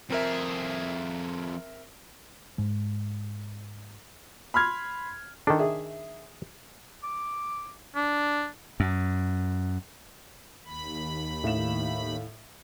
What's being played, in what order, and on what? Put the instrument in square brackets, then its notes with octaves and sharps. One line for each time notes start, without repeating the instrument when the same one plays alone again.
[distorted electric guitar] F2 G#4 [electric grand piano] C4 A#4 E5
[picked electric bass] G#2 G#3
[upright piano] B5 C6 F6 G#6
[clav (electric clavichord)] D#3 D4 [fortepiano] A4
[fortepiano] G#4 E5
[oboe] D6
D4
[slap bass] F#2
[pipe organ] D#2 B5
[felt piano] A2 F5 E7